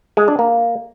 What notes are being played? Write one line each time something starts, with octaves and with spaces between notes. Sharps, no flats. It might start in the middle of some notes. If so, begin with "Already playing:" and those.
G#3
D4
A#3